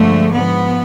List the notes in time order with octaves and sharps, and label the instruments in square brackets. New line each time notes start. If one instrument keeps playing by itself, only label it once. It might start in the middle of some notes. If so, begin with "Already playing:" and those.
Already playing: [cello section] G2 D3 F3 G#3 A3
G#2 F3 G#3 B3